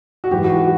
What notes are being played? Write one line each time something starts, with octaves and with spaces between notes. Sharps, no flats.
F#4
G#2 E3 G4
F#4
F#4